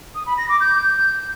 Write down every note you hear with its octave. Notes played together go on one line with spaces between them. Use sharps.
D#6
B5
A#6
D6
G6